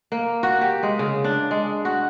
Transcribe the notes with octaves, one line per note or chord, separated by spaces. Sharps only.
A#3
F#4
G4
G#3
C#3
D4
G#3
F#4